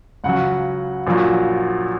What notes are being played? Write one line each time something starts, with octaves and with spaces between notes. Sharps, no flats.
C#2 C#3 F#3 F#5
A#1 A#2 F#3